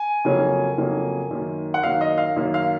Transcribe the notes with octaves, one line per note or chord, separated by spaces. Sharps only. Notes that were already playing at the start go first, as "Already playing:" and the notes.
Already playing: G#5
F2 C#3 F#3 A#3 C#4
F2 C#3 F#3 A#3 C#4
F#2 D#3 A#3
F#5
F#2 D#3 A#3 F5
D#5
F5
F#2 D#3 A#3
F5